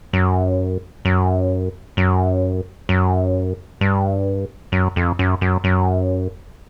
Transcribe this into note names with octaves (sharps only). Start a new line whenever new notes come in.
F#2
F#2
F#2
F#2
G2
F#2
F2
F#2
F#2
F#2